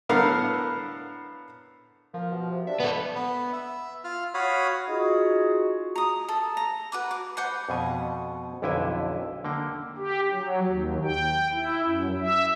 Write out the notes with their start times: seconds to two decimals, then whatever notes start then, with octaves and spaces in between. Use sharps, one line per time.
0.09 A2 D3 B3 A#4 F5
2.14 F3 A#3
2.31 B2
2.51 C3
2.67 D4 E5
2.80 B3 A4 B4
3.15 B3
3.53 E5
4.04 F4 F6
4.34 F#4 C#5 F5 B5 D#6
4.89 D#4 F4 F#4 G#4
5.96 A#5 D#6
6.28 A4
6.57 A#5
6.92 F#4 B4 D6
7.11 D6
7.37 B4 C5 F#5
7.69 F2 B2 G#5
8.62 B1 F2 D3 E4 G5 G#5
9.45 D3 A#3 G5
9.98 G4
10.33 F#3
10.67 D#2
11.05 G5
11.52 E4
11.84 F#2
12.21 E5